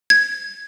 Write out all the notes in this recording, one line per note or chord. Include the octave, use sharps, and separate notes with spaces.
G#6